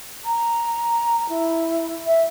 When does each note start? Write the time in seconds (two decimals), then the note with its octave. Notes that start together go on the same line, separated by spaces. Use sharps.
0.24 A#5
1.29 E4
2.06 E5